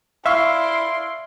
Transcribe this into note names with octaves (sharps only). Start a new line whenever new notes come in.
E4 D5 E5 F5 C6 C#6